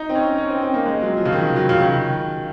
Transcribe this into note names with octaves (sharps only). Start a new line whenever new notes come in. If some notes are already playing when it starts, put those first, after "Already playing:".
Already playing: D#4
C4
C#4
C#4
C4
C4
A#3
G#3
F#3
F3
C#3
D#3
F#3
C#3
D#3